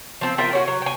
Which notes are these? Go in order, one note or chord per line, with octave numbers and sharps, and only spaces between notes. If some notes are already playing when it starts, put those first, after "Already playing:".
F3 C4
F4 A#4 E5 G5
C#4 F#4
F#3
G5 G#5